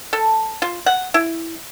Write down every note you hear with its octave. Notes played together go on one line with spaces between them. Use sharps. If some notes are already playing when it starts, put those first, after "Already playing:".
A4
F4
F#5
E4